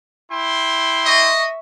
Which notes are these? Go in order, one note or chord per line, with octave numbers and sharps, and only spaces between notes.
E4 G5 C6
D#5 E5 C#6